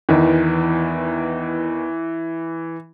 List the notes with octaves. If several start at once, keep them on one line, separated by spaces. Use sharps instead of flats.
E2 D#3 E3